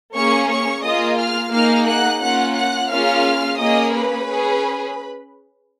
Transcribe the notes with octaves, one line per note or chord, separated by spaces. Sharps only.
A#3 C#4 G#4 C#5 C#6
C#5 C#6
A#3 F4 G#4 D#5 D#6
F5 F6
A#3 D#4 G#4 F5 F6
F#5 F#6
A#3 C#4 F4 F#5 F#6
F#5 F#6
A#3 C#4 F4 G#4 F5 F6
A#3 C#4 G#4 D#5 D#6
B4 B5
C#4 G#4